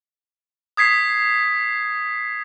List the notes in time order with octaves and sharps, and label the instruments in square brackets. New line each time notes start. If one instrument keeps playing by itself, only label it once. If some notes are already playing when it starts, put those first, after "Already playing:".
[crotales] D#6 G#6 B6 C7